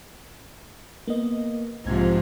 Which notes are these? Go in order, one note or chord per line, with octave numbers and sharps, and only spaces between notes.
A#3 B3 D#5
B1 G#2 C3 F3 G#6